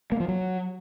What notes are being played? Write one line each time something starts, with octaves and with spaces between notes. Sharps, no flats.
A#3
F3
F#3